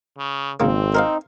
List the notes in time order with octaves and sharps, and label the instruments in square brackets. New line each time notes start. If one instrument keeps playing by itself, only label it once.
[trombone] C#3
[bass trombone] G#1 [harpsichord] C#3 A#3 [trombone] C4
[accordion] D#4 [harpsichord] A#4 C5 F5